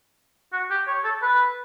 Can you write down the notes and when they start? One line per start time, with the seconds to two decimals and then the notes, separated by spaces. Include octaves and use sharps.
0.53 F#4
0.70 G4
0.87 C#5
1.04 A4
1.22 B4